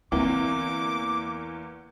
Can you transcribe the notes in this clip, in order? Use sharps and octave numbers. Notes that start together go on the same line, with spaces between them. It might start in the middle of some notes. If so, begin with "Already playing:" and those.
E2 D3 E3 A#3 C4 D6